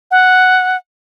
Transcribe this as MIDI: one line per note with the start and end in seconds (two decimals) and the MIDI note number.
0.11 0.77 78